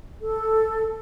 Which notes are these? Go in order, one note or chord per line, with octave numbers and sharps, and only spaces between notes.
A4